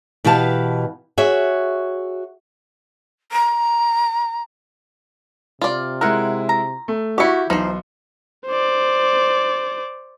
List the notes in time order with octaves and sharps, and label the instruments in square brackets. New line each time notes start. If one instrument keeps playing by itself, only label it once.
[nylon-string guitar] B2 E3 G4 F5 A5
F#4 G#4 C#5 E5
[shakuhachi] A#5
[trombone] C3 [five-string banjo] F4 D5
[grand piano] G#3 E4 [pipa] A#4 F#5
[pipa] A#5
[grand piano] A3
[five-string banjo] E4 G4 [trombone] F#4 [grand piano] C#6 C#7
[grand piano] B1 C6 [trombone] E3 [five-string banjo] F3 C5 [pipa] D#4
[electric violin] C5 D5